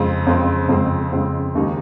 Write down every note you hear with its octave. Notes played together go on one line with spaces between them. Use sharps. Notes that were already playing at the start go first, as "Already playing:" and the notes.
Already playing: F2 C#3 G#3 C4
F2 C#3 G#3 C4
F2 C#3 G#3 C4
F2 C#3 G#3 C4
D#2 C#3 G#3 D#4 G4